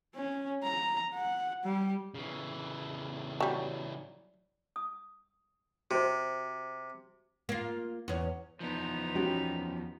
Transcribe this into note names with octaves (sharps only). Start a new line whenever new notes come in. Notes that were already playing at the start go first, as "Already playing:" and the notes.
C#4
A#5
F#5
G3
C#3 E3
F#3 G3
D#6
C3 F#4 C5
A#3 F4
E2 C#4
E2 F3 B3 D#4
C#4 F#4 G4 G5